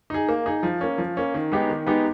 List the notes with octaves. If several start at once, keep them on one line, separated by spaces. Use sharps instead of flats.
D#4 G#4
A#3
D#4 G#4
F3
A#3 C#4
F3
A#3 C#4
D#3
G#3 B3 D#4 G4
D#3
G#3 B3 D#4 G4